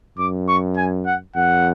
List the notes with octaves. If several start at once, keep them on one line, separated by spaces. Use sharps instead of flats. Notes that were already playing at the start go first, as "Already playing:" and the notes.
F#2 D6
C#6
G#5
F#5
F2 F#5